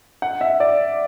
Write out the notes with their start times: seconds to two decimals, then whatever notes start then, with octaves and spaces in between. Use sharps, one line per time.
0.22 F#5
0.41 E5
0.60 D5